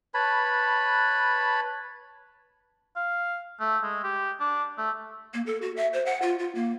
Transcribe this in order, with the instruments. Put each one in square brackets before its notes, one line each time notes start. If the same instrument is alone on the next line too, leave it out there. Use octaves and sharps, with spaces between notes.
[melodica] B4 C#5 A5 B5
[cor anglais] F5
A3
G#3
G4
D4
A3
[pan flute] A#3
A4
F#4
E5
C5
F#5
F4
F4
A#3